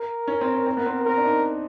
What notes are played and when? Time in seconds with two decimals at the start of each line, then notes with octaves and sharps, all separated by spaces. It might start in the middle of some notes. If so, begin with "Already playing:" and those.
Already playing: A#4
0.28 C#4
0.41 C4
0.53 C#4
0.67 C4
0.77 B3
0.86 C4
1.05 C4 A#4
1.17 D4
1.25 D#4